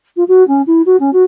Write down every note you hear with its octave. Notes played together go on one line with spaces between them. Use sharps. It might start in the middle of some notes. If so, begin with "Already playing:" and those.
F4
F#4
C#4
E4
F#4
C#4
F#4